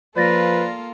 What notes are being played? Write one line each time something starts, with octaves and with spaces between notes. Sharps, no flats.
F3 A#3 F4 A4 B4 D5 A6 A#6